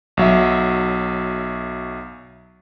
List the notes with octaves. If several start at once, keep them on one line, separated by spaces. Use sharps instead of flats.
B1 F#3 E5